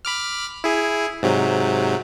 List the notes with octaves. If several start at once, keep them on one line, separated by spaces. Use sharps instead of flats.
B5 D6 F6
E4 G#4
G#2 C3 F#3